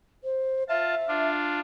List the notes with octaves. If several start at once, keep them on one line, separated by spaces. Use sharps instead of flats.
C5
F4 E5 A5
D4 F4